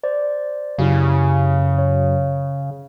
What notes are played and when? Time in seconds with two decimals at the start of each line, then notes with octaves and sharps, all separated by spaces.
0.03 C5 D5
0.78 F#2 C#3 E4 G4 F5
1.78 C#5